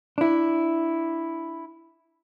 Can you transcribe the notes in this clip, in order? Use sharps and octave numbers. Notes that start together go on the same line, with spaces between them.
D4 E4